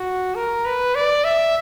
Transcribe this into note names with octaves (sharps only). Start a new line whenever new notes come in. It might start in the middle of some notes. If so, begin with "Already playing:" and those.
Already playing: F#4
A#4
B4
D5
E5